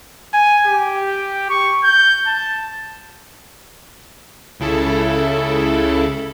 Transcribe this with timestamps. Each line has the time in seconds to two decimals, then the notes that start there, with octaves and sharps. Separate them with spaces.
0.34 G#5
0.67 G4
1.50 C#6
1.84 G6
2.26 A5
4.60 C#2 C#3 E4 A4